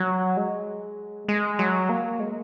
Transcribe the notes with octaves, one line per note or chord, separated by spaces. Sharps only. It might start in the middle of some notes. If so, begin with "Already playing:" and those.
Already playing: F#3
G#3
G#3
F#3
A#3
G#3